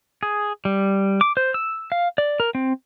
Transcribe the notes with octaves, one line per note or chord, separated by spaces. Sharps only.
G#4
G3
D6
C5
E6
F5
D5
A#4
C4